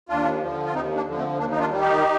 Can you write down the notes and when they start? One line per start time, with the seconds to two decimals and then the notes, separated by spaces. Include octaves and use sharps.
0.09 D#2 D4 F4
0.41 D3 F3
0.65 F4
0.74 D#2 C4 D#4
0.96 A#3 D4
1.07 D3 F3
1.16 A3 C4
1.39 D#2 A#3 D4
1.51 D#4
1.59 D4 F4
1.71 D#3 G3
1.81 D#4 G4